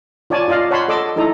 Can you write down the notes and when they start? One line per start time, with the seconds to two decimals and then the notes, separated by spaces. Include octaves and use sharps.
0.30 F4 C#5 D5 G#5 A5
0.48 F4 D5 D#5 F5
0.71 C#5 F#5 A5 B5 C6
0.88 A4 D#5 C6 D6 E6
1.16 D#4 E4 A4 D#5 A#5